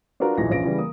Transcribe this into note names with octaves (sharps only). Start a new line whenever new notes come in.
D4 F4 F#4 A#4 B4
B1 E2 A#2 E3 A#6
A#1 C#4 F4 B4 A#6 D7
C#3 E3 G3
A#3 D#6